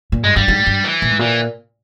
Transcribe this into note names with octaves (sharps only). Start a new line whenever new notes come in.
A#2
G2 G#3
G2 G3
G#2
G2
E3
A#2
G#2
A#2 E3